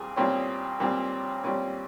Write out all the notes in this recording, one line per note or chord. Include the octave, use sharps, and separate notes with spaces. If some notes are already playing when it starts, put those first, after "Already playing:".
Already playing: A#2 G3 C4 G#4
A#2 G3 C4 C#4
A#2 G3 C4
A#2 G3 C4 C#4